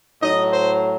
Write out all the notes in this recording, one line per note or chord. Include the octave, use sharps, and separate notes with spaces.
A2 F#3 D#5
C5